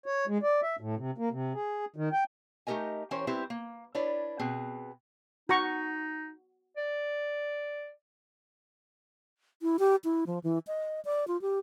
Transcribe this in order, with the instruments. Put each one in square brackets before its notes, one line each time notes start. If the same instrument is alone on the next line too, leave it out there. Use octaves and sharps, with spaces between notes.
[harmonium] C#5
G#3
D5
E5
A2
C3
A#3
C3
G#4
D#3
G5
[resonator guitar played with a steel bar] A3 D#4 G4 A#4 D#5 G#5
E3 C#4 G4 A#4 C5 C#5
G3 C4 E4 G4 B4 C5
A#3
D4 E4 B4 C#5 D5
B2 C4 G#4 B4
[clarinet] D#4 [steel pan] F#4 A#5 C#6
[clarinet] D5
[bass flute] E4
G4
E4
F3
E3
D#5
D5
F4
G4